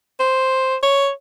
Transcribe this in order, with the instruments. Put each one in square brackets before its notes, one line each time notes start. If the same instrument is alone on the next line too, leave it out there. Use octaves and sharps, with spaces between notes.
[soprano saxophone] C5
C#5